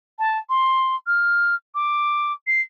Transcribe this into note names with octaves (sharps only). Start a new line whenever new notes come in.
A5
C6
F6
D6
C7